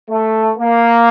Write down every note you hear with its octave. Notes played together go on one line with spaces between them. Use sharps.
A3
A#3